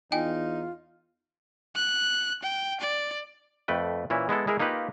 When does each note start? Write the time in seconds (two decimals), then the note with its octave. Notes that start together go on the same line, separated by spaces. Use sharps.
0.12 E2 D#4 F4 G5 G#5
1.75 F#6
2.43 G5
2.80 D5
3.68 F2 A3 B4 G5
4.10 A#2 E3 C#4 E4
4.29 G#3 B3 E4 A4
4.47 G#3 E4 G#4 A#4
4.60 A#3 D#4 F4 G4 B4